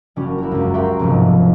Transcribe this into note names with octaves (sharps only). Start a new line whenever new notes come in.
F#1 G3 C#4 F#4
E4 F#4 A#4
C#2 F#2
F#4 G4 E5 G5 A#5 C6
F1 B1 F2 G#2